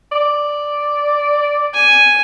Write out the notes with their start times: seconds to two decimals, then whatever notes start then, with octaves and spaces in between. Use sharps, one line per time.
0.12 D5
1.74 G#5